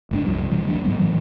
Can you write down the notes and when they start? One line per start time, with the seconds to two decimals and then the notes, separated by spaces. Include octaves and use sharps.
0.11 F#1 G#2 C4 D4
0.26 C2 F#2 F3 G3
0.51 B2 E3 G3
0.65 D2 F#3 D4
0.84 G#2 F#3 G3 B3
0.99 A2 E3 F#3